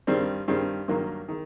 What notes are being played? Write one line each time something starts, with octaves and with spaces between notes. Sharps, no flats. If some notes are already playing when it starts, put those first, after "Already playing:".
G2 D#3 G3 C4
G2 D#3 G3 C4
G2 D#3 F#3 A#3
D#3